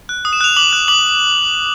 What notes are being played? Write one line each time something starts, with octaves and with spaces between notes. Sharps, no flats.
F#6
D#6
E7
F#6 F7
D6 F#7
F#6
D6 F#7